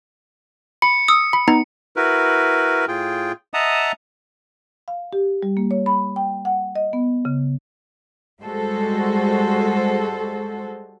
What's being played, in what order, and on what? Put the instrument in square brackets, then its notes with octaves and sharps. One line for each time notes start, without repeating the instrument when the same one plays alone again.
[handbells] B5 [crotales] C#7
[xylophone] D#6 E6
[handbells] B5
B3 D#4 A#5
[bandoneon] E4 F#4 A#4 B4
A2 F4 G#4 G5
D#5 E5 F#5 A5 A#5 D#6
[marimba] F5
G4
G3
A#3
C#5
B5
G5
F#5
D#5
B3
C#3
[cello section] G3 G#3 F#4 A4 C5